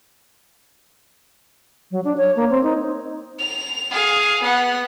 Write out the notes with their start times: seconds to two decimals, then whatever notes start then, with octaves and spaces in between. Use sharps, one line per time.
1.91 F#3
2.04 D4
2.17 C#5
2.36 A#3
2.50 C4
2.63 D#4
3.39 F7
3.91 G#4 F5
4.43 B3 F#5